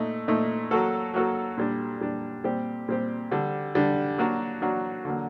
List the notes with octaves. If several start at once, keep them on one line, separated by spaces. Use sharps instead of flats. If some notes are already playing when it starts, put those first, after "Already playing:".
Already playing: A#2 A3 D#4
A#2 A3 D#4
F#3 A#3 F#4 A4
F#3 A#3 F#4 A4
A#2 G3 D4
A#2 G3 D4
A#2 G3 C4 G4
A#2 G3 C4 G4
D3 G3 D4
D3 G3 D4
F#3 A#3 D4 F#4
F#3 A#3 D4 F#4
D3 F#3 A#3